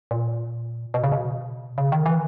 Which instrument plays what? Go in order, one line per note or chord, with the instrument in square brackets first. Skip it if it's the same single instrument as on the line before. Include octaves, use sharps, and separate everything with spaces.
[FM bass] A#2
B2
C#3
B2
C#3
D#3
E3